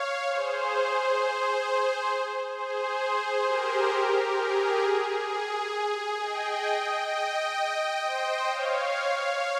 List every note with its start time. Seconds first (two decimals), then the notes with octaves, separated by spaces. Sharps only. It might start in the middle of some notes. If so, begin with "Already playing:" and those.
Already playing: C#5 F5
0.27 G#4 C5
2.56 G#4 C5
3.46 G4 A#4
4.37 G#4
5.29 G#4
6.19 D#5 G5
7.11 D#5 G5
8.02 C5 D#5
8.47 C#5 F5